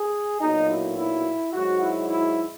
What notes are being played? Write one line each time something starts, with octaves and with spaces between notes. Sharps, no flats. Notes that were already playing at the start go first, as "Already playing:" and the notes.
Already playing: G#4
B1 A#2 F#3 D#4
E4
E4
G#1 G#2 F#3 F#4
E4
E4